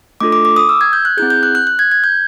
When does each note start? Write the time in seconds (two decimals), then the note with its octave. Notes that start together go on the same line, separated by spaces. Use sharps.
0.20 A3 D4 F4 A4 D6
0.32 D6
0.45 D6
0.56 D#6
0.69 E6
0.81 G#6
0.93 G6
1.05 F#6
1.17 C4 E4 G#4 G6
1.30 G6
1.43 F#6
1.55 F#6
1.67 F#6
1.79 G#6
1.92 G#6
2.04 G6